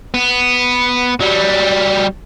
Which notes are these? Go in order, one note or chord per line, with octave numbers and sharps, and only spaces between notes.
B3
F#3 G3